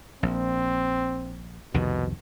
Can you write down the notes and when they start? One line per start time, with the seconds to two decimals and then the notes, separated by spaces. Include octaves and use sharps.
0.23 A#1 C4
1.74 C2 F2 B2 D#3